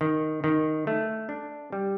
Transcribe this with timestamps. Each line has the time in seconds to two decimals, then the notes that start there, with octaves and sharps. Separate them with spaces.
0.01 D#3
0.44 D#3
0.87 A3
1.29 D4
1.72 G3